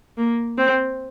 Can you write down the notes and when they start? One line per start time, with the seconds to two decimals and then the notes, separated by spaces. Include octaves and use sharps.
0.17 A#3
0.57 C4